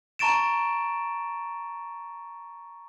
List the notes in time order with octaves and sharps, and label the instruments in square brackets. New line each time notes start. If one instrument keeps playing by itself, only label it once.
[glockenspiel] A5 A#5 C#6 A6 D7 E7